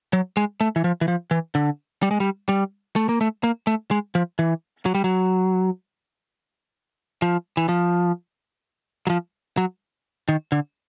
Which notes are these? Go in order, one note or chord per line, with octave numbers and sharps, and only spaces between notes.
F#3
G#3
A3
E3
F3
E3
F3
E3
D3
G3
G#3
G3
G3
A3
A#3
A3
A#3
A3
G#3
F3
E3
F#3
G3
F#3
F3
E3
F3
F#3
F3
F#3
D#3
D3